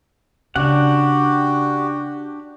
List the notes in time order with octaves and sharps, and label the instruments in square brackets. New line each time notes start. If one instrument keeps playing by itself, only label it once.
[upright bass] C#3 [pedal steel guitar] D4 F#5 [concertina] F#4 G4